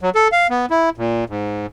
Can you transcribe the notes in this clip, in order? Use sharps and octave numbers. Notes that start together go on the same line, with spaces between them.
F#3
A4
F5
B3
E4
A#2
G#2